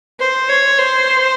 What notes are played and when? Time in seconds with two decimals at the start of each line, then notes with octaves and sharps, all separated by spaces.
0.20 C5
0.49 C#5
0.78 C5